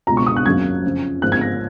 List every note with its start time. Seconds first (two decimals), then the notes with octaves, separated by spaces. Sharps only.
0.07 C#2 B2 G#3 A#5
0.17 C#6
0.27 D#6
0.36 F#6
0.46 G#1 F#2 C#3 F#3 A#3 G#6
0.84 F2 C#3 F3
1.21 G#1 G#2 F3 A#3 F#6
1.32 G#6
1.41 A#6